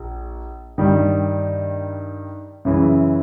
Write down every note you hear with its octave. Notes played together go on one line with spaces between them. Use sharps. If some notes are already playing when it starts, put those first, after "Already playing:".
Already playing: A#1
G2 D#3 G3
F#2 C#3 E3